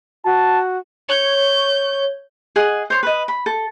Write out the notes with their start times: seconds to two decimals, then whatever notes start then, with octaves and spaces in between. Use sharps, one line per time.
0.25 F#4 A5
1.09 C#5 G6
2.56 G#4 D#5 F#5
2.90 C5 C#5 C6
3.03 B4 D#5
3.28 B5
3.46 A4